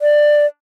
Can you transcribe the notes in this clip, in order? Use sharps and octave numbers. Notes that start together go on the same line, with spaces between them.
D5